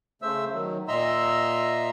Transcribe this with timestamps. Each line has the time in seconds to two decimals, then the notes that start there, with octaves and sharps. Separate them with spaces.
0.22 C#3 A3 C5 E5 E6
0.53 D#3 F#3
0.88 A#2 D#5 E5 A#5 C6 E6